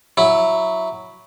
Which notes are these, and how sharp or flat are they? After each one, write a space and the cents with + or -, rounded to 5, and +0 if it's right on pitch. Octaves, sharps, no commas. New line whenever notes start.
F#3 +0 E4 +0